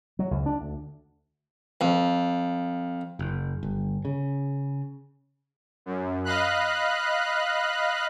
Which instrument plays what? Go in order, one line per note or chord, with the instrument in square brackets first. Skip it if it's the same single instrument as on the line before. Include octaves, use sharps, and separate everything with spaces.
[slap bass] F#3
C#2
D4
D2
[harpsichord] F2
[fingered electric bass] F#1
G1
C#3
[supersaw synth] F#2
D#5 F5 B5 F#6